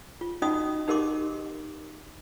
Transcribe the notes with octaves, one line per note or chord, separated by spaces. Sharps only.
F4
C#4 D#4 F4 F#4 D#5 D#6
D#4 G4 A#4 D#5 C6 D6